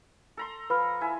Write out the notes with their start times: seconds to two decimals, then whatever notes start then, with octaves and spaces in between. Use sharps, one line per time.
0.37 A4 A#5 C6
0.70 F3 B4 B5 F6
1.01 E4 E5 G#5